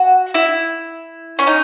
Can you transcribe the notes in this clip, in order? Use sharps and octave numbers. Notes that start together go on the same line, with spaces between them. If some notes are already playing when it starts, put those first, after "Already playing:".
Already playing: F#4
E4
C#4
D#4